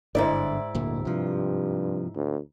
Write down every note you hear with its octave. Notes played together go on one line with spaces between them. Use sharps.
G1 G#2 D3 E4 D5
D1 D2 A#2
G2 C3 F3
D2